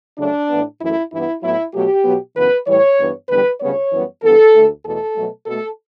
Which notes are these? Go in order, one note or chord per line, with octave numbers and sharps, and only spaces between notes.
D2 C#3 F#3 A3 D4
A2 E3 B3
F#2 E3 A3 E4
G2 E3 B3 E4
A2 F#3 B3 E4
B2 F#3 A3 G4
B2 F#3 B3
F#2 C#3 E3 B3 B4
A2 E3 G3 C#5
G2 E3 B3
E2 D3 G3 B3 B4
D2 C#3 G3 B3 C#5
F#2 E3 G3 B3
G2 E3 B3 A4
D2 D3 A3
E2 B2 A3 A4
B2 F#3 A3
B2 A3 A4